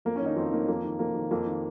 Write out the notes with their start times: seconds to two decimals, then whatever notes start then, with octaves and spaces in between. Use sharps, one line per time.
0.05 F2 A#3
0.16 C#4
0.21 D#3
0.26 D#4
0.36 F2 C4
0.53 D#3 A#3
0.68 F2 A#3
0.84 D#3
0.99 F2 A#3
1.15 D#3
1.31 F2 A#3
1.47 D#3